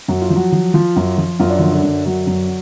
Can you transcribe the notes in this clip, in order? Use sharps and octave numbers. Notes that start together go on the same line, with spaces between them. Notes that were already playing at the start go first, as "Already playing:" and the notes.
F#2 F#4
F4
F3
F#3 F#4
F3
F3 F4
F#2
F3
F#2 F4
D4
D3 F3 F4
D3 D4
F#2
D3 F#3 F#4
F#2